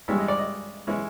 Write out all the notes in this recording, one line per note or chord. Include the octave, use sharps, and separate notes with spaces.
G2 E3 G#3 C#4 E4 E5
D#5
D5
D#5
E3 G#3 C#4 E4